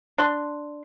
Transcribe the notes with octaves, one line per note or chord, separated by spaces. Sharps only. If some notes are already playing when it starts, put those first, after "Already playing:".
D4 C6